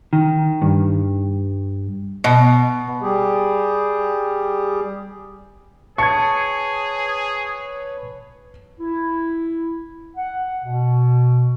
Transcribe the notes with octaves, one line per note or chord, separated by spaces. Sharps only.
D#3
G2
B2
G3 G4 G#4
G#4 B4 C#5 A5 C#6 G#6 C#7
E4
F#5
B2